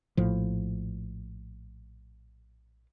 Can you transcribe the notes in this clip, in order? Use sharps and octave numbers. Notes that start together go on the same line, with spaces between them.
A#1 A2 F3